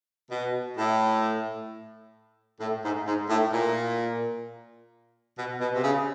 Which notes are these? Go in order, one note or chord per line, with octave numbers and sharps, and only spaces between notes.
B2
A2
A2
G#2
G#2
A2
A#2
B2
B2
C3
C#3